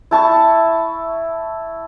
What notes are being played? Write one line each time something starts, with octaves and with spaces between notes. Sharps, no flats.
E4 A5 C#6